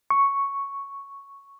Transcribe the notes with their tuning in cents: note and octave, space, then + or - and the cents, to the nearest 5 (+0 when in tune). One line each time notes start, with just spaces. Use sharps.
C#6 +0